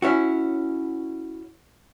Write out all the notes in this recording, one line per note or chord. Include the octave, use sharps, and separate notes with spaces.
C#4 E4 F#4